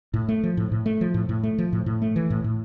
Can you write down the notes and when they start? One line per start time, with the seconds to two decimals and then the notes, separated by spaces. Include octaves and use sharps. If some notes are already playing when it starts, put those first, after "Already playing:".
0.14 A2
0.29 A3
0.43 F3
0.57 A2
0.72 A2
0.86 A3
1.01 F3
1.14 A2
1.29 A2
1.43 A3
1.58 F3
1.72 A2
1.86 A2
2.02 A3
2.16 E3
2.30 A2
2.44 A2